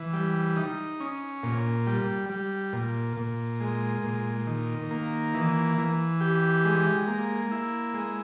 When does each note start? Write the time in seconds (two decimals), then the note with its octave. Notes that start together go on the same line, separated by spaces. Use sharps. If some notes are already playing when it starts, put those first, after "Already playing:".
Already playing: E3
0.13 G3
0.56 D#4
1.00 C#4
1.43 A#2
1.87 G3
2.30 G3
2.73 A#2
3.17 A#2
3.60 G#3
4.04 A#2
4.47 D#3
4.91 A#3
5.34 E3
5.78 E3
6.21 G4
6.65 G#3
7.08 A#3
7.51 E4
7.94 G#3